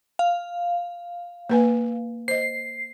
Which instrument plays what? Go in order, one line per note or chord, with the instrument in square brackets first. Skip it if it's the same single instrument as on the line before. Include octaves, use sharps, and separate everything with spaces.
[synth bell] F5
[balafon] A#3 B4 G#5
[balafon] C5 D#5 [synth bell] C7